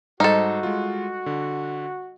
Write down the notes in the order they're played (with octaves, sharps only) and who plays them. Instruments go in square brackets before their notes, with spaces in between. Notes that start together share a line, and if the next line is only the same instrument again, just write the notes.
[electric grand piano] G#2 C5 [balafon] G3 D#5 [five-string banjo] D#4 A4 [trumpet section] F#4
[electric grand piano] G#3 F4
D3